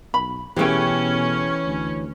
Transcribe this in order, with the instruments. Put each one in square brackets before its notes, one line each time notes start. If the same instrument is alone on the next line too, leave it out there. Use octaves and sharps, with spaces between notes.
[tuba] B1 [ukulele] B5
[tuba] B2 [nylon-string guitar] E3 A3 [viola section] C#4 [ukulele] G4 G#4 G5
[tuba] D2